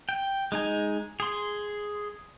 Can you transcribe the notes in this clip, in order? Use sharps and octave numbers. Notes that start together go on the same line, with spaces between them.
G5
G#3 D#4 G#5
G#4 C6